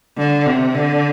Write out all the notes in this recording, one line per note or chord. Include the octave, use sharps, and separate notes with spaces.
D3
C3
D3